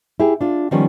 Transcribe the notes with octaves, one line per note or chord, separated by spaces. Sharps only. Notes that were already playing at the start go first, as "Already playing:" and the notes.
E4 G4 G#4
D4 F4
D#3 F3 G3 B3 C#4